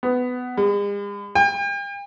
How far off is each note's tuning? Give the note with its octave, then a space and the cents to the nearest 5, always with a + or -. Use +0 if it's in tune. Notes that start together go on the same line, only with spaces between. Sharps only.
B3 +15
G#3 -45
G5 +40